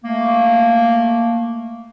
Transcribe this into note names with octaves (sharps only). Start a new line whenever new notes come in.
A3 A#3